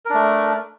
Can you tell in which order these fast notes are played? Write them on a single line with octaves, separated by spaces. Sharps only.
A#4 D4 A3